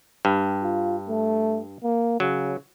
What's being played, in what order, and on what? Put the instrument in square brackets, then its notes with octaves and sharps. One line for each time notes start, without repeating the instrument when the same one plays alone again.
[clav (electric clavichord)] G2
[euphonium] F4
A3
A#3
[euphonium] C#3 [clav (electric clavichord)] F#3